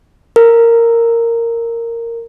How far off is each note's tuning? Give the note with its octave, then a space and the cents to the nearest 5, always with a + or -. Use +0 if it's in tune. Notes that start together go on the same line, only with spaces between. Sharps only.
A#4 -10